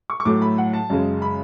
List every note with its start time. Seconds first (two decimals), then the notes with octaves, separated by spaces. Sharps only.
0.10 C#6
0.20 C#6
0.25 A2 F#3 A3 D6
0.42 B5
0.58 F#5
0.73 A5
0.90 F#2 C#3 G#3
1.22 B5